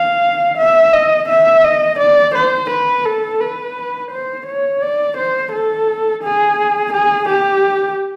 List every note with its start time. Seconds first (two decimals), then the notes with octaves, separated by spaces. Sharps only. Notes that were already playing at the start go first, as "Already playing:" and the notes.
Already playing: F5
0.58 E5
0.93 D#5
1.29 E5
1.64 D#5
2.00 D5
2.35 C5
2.70 B4
3.06 A4
3.41 B4
4.11 C5
4.47 C#5
4.82 D5
5.18 C5
5.53 A4
6.24 G#4
6.93 G#4
7.29 G4